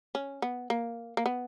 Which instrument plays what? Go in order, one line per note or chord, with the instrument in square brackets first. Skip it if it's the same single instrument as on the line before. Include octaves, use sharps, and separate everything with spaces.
[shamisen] C#4
B3
A#3
A#3
B3